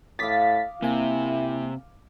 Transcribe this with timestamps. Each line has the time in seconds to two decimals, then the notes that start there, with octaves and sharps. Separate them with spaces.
0.19 A2 F5 D6 D#6 A6 B6
0.82 C3 A#3 E4 G#5